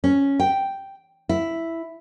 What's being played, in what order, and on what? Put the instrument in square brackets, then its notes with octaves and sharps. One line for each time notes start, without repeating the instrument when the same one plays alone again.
[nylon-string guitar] C#4
G5
E4